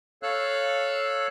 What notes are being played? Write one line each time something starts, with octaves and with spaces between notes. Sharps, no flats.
A4 C#5 F5 E6 F#6